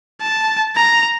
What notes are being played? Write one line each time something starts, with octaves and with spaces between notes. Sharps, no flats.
A5
A#5